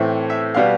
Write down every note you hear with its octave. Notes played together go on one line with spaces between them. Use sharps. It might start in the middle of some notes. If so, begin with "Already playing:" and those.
Already playing: A2 E3 A3 C4
E5
B2 G3 B3 F5